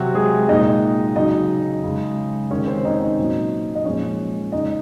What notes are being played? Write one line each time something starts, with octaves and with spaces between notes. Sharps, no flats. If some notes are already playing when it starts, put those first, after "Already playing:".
Already playing: C3 F#3 F#4
G#3 G#4
A#2 G#3 D#4 D#5
C#3 F#3 D#4 D#5
C#3 G#3
C3 D#3 G#3 C#4 C#5
C4 C5
D#4 D#5
D#4 D#5
A#2 F#3
D#5
A#2 F3 G#3 C#4 C#5
C#3 G#3 D#4 D#5